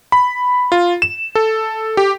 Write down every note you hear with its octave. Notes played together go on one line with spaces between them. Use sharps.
B5
F4
E7
A4
G4